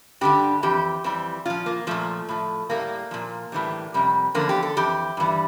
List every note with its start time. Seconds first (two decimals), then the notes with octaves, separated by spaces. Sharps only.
0.21 G2 D3 G3 G4
0.63 F2 E3 G4
1.04 F2 E3 G3
1.46 A#2 F3 F4
1.66 A#3
1.87 A#2 F3 A3
2.29 A2 F3
2.69 A2 G3 A#3
3.11 A#2 F3
3.52 A2 E3 G3
3.94 F2 C3 G3
4.35 E2 D3 F3 A#3
4.49 G4
4.63 A4
4.77 F2 E3 G4
5.17 G2 E3 G3